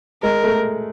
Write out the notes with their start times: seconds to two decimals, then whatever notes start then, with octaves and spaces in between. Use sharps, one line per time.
0.23 G#3 A#4
0.44 A3